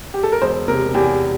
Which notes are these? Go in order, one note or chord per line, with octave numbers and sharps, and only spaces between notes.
G4
A4
A#4
E1 C5
C3 A#4
E2 G4